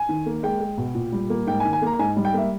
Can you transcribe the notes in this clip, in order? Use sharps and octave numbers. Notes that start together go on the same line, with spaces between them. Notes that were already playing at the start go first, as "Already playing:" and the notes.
Already playing: G#5
D#3
A#3
G#3 G5
G#3
B2
A#2
G3
A#3
G#2 G5
G#5
D#3
G#5
A#3 A#5
A#5
G#2 G#5
G3
G5
A#3 E5